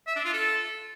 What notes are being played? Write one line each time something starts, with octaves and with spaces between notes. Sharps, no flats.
E5
D4
F4
A4